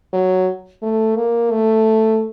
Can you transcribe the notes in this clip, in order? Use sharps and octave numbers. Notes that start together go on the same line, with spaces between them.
F#3
A3
A#3
A3